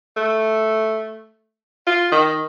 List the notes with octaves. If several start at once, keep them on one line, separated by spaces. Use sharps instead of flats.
A3
F4
D#3